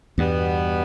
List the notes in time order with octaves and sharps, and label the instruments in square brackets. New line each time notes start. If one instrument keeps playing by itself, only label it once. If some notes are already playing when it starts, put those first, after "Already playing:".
[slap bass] E2 G2 [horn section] B2 G3 B3